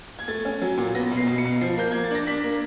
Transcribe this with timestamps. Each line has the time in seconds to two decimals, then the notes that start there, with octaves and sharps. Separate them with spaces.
0.19 G#6
0.28 A3 A6
0.45 C#4
0.62 F#3
0.77 A#2
0.95 B3 A#6
1.11 B2
1.17 C7
1.27 B2
1.38 C#7
1.45 B2
1.61 F3 C7
1.77 A#3 G6
1.91 A#3 G#6
2.04 A6
2.11 D4 A#6
2.27 D4 B6
2.44 A#3